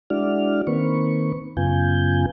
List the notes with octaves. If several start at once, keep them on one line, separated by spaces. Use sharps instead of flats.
G#3 D4 E4 F#4 D5 F6
D#3 A#3 C4 B4 C#6
F#2 C#3 B3 F4 G#5 G6